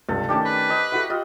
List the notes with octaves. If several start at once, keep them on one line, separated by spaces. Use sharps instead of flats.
C#2 G2 C3 A4
D#3 A3 C#4 D4 G4 A5
B4
C5 D#5 A#5
E4 F#4 A4 F#5
F4 G4 D#5